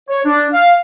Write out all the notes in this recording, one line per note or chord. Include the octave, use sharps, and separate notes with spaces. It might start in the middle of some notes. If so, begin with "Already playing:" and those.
C#5
D4
F5